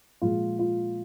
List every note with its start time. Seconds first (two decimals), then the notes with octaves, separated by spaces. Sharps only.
0.22 A#2 F3 G#3 F4
0.59 F4